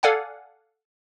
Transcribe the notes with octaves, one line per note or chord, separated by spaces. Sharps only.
A4 D5 F5 F#5 G#5